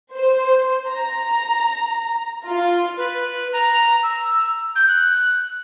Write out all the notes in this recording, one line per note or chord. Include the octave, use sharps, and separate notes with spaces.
C5
A#5
F4
B4
A#5
E6
G6
F#6